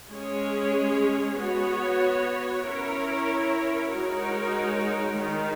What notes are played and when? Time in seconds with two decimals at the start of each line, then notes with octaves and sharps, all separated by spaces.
0.11 G#3 C#4 G#4 C#5
1.38 B3 F#4 C#5
2.65 C#4 E4 A#4 C#5
3.93 G#3 D#4 F#4 A#4 C#5
5.19 D#3 G#3 D#4